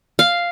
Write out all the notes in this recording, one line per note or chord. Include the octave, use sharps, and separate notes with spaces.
F5